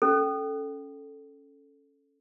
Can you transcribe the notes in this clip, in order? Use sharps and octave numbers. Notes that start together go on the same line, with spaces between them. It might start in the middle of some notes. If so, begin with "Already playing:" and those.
C#4 A4